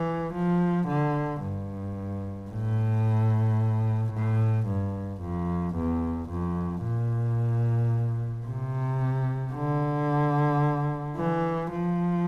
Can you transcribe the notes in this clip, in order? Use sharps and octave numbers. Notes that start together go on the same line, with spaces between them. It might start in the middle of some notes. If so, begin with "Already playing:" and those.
Already playing: E3
F3
D3
G2
A2
A2
G2
F2
E2
F2
A#2
C3
D3
E3
F3